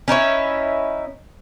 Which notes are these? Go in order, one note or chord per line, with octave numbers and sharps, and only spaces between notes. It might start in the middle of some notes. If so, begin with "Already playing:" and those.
C#4 D#4 E4 C#5